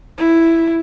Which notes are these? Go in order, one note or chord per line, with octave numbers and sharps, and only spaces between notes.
E4